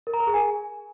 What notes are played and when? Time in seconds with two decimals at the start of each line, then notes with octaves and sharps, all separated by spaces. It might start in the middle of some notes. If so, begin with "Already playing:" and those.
0.07 A#4
0.14 A#5
0.20 A#4
0.27 G#4
0.34 G#5